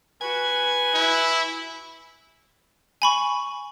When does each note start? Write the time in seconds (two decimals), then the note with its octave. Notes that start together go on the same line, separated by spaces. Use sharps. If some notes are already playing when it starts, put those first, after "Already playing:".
0.21 F#4 B4 G#5
0.94 E4
3.02 G#5 B5 C#6